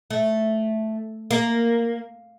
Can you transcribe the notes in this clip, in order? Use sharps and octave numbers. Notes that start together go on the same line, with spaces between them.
A3
A#3